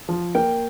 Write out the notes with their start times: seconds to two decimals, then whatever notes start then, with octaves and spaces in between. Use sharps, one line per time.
0.09 F3
0.35 A#3 G5